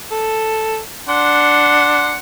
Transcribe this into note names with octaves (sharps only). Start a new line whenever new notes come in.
A4
D4 F#5 C6